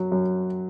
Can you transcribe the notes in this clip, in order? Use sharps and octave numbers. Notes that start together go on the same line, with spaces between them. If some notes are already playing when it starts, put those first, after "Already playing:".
Already playing: F#2 F#3
F#2